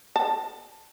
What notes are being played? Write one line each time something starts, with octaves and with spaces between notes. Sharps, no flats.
A5